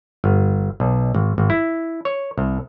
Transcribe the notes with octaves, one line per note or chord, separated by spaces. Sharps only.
G1
B1
G#1
G#1
E4
C#5
C2